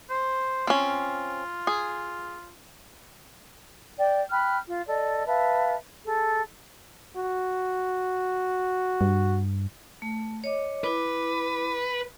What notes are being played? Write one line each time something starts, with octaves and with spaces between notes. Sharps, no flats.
C5
C4 C#4 F4
G#4
D5 G5
G5 B5 F6 F#6
F4
A4 D5 D#5
B4 E5 F5 A5
G#4 A4
F#4
G2
A3
C#5 D#5 D6
E4 B4 D6